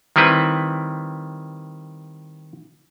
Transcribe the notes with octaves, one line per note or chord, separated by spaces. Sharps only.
D#3 G3 C4 E4 B4